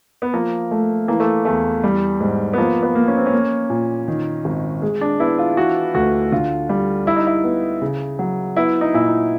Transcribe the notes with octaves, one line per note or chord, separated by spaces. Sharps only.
B3
F3 A#3
A3
E3 A#3
A3
E2 A3
G3
G#2
B3
F3 A#3
B3
A#3
C#4
C4
C#4
A#3
A#2
D#3
G#1
G#3
D4
B3 E4
F4
E3 F#4
D2 F#4
D3 F4
G3
G3 E4
D#4
E4
B3
C#3
F#3
B3 E4
D#4
A#2 E4
D#4